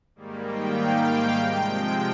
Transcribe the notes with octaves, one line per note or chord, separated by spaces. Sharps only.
G#2 D#3 G3 A#3
G5
F5
C3 F3 G#3 G5
G5